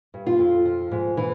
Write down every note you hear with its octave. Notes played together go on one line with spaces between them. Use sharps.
G2
F4
F2
F3
G#2
E3